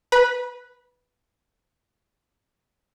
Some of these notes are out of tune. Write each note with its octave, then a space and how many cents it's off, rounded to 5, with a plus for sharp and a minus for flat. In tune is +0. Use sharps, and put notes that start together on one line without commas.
B4 +0 B5 -35